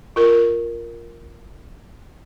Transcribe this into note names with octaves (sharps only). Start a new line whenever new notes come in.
F4 A#4